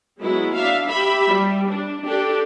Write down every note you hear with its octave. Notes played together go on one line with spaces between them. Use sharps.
F#3 G#3 B3 E4
D4 E5 F5
G4 E5 B5
G3
D4
D4 G4 A4